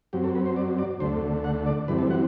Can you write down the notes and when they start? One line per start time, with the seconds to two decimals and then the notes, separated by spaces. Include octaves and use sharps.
0.13 F#2 F#3 C4 G4
0.24 A4
0.35 B4
0.46 C5
0.56 D5
0.78 D5
1.00 D2 D3 A3 C5
1.44 F#5
1.66 D5
1.88 F#2 E3 G3 C4 B4
1.99 A4
2.10 F#5